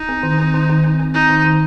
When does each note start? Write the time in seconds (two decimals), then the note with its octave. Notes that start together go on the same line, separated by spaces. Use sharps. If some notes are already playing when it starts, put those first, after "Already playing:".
Already playing: D#4
0.09 C4
0.23 D#3
0.38 C4
0.54 D#3
0.70 D#3
0.84 C4
1.00 C4
1.14 C4 D#4
1.30 D#3
1.45 D#3